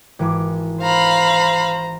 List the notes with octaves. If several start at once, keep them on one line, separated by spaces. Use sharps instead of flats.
G#1 E3 D6
C5 F5 A#5 B5